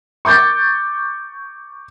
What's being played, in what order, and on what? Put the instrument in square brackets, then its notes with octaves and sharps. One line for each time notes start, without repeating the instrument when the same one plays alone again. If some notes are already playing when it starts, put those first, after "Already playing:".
[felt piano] C#6 D6 G6 A6